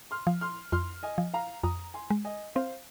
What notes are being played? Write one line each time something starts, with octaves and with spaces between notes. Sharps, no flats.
C6 F6
F3
C6 F6
F2 C6 F6
D#5 G#5
F3
F5 A#5
F2 A#5 D#6
G#5 C6
G#3
D#5 G#5
C4 C5 F5